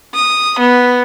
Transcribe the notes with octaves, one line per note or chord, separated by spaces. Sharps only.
D#6
B3